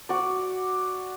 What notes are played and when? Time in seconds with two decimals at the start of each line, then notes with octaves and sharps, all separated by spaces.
0.09 F#4 D5